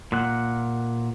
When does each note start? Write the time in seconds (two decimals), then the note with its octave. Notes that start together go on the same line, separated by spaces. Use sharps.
0.12 A#2 F#5